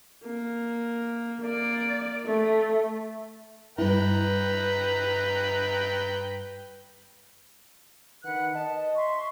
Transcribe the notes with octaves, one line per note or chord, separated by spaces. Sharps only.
A#3
A#3 D5
A3
G2 E4 B4 G5 A#5
D#3 B4 F#5 F#6
D#5 A5
E5 C6 C#6